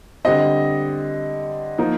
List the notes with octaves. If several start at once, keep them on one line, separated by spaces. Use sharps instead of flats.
D3 G3 C4 D#5
F3 A#3 D#4